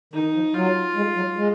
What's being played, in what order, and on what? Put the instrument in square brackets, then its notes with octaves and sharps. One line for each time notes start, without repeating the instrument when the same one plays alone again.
[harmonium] D#3 [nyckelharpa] D#4
[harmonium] F3
[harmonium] F#3 [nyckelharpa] F4
[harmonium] G#3
F#3
G#3